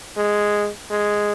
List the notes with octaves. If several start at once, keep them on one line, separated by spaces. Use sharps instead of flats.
G#3
G#3